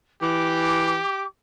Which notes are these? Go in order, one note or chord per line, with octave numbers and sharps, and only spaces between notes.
E3 G4 D6